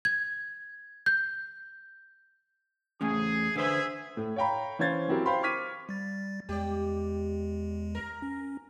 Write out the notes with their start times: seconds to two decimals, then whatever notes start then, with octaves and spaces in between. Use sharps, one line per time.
0.05 G#6
1.06 G6
3.01 E2 A3 C#4 G#4
3.56 D3 G#4 B4 C5 E5
4.17 A2
4.36 C#5 F5 G5 A#5 B5
4.79 E3 C#4 C5 F5 G#6 A6
5.08 E3 F#3 C4 E4 G4 A#4
5.26 C5 F5 G5 B5 C6
5.43 C#6 D6 F6 G#6 B6 D#7
5.89 G3 A6
6.49 E2 G#3 G4 D5
7.95 A#4
8.22 C#4